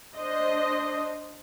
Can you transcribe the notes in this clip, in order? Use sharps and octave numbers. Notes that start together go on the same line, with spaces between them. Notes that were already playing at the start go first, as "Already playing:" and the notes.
D4 C5 D#5